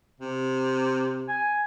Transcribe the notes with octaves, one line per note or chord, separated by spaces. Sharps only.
C3
G#5